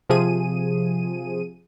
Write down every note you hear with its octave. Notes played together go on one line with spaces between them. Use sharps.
C3 F3 G#4 D#7